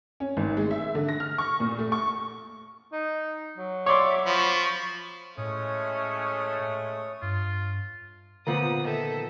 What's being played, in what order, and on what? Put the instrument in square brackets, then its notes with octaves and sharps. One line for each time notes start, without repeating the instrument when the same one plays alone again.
[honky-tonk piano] C#4
G#1
G#3
E5
D3
A#6
F6
C#6
A#2
A3
C#6
[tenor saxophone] D#4
F#3
[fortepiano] C#5 D5 C6 [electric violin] E5 D6
[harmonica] F3 [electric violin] B5 C#6
[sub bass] A2 [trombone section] G#3 A3 [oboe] C#4 [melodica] C#5 D#6
[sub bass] G2 [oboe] F4
[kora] A#2 F3 B3 [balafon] D3 [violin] D#6
[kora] D#3 [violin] A4 E5